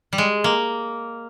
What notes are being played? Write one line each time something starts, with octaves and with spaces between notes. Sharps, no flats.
G3
G#3
A#3